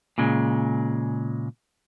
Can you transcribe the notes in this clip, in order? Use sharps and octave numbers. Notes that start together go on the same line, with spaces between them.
A#2 C#3 G#3